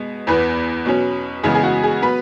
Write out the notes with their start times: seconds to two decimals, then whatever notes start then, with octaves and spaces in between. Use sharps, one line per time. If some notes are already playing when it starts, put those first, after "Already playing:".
Already playing: B2 G#3 B3
0.27 E2 E3 B3 B4
0.85 B2 F#3 C#4
1.43 C#3 E3 G#3 B3 G#4
1.54 G#4
1.64 F#4
1.83 G#4
2.02 F#3 B3 B4